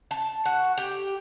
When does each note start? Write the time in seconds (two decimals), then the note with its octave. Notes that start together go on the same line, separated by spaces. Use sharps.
0.11 A5
0.45 F#4
0.77 G4